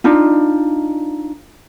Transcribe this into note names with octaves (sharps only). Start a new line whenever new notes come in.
D4 D#4 F4